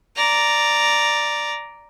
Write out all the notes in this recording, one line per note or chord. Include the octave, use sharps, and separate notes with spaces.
D5 A#5